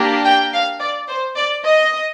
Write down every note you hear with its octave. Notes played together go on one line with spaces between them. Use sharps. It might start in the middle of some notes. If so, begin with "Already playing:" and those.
Already playing: A#3 D4 G4
G5
F5
D5
C5
D5
D#5